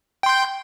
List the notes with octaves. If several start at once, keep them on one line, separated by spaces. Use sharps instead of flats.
G5 C6 G6